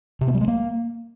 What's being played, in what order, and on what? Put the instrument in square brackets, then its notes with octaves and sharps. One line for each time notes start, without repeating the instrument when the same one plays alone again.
[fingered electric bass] C3
B3
G3
G#3
A#3